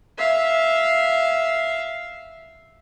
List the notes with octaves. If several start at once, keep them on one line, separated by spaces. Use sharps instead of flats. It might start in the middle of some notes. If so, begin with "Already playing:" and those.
E5 F5